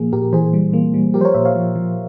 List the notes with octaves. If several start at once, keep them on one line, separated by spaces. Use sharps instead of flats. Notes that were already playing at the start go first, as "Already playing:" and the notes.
Already playing: A#2 F3 A#3 G#4
A#2 G4 A#4
E3 G#4 C5
G3
A#3
G3
F3 G4 A#4
C5
A#4 C#5
A#2 C5 E5
C#5 F5
F3
F3